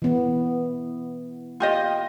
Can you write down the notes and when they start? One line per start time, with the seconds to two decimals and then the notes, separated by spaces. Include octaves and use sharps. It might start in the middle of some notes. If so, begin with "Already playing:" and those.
0.02 E3 B3
1.60 F4 G4 D#5